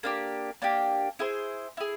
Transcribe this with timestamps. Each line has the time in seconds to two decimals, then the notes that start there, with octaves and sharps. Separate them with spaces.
0.03 A#3 D4 G4
0.62 A#3 D4 G4
1.19 E4 G#4 C5
1.77 E4 G#4